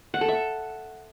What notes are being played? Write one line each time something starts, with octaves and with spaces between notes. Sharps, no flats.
F#5
A4
E5